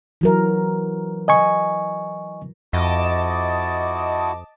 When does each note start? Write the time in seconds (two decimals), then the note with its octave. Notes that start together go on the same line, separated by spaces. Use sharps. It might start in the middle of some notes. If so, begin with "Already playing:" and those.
0.21 E3 F#3 A#4
1.28 D#5 G#5 C#6
2.73 F2 E4 F#4 D#5 A5 D6